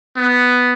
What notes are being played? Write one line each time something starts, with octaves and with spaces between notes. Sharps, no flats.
B3